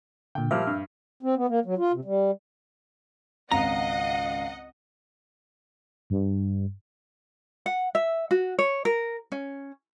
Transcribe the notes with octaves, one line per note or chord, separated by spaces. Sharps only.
A#2 D3 G5
A#2 F3 G3 E5 F6
G2
C4
B3
A#3
F#3
F4
C3
G3
G#1 C#2 D#5 F5 F#5 A#5
G2
F#5
E5
F#4
C#5
A#4
C#4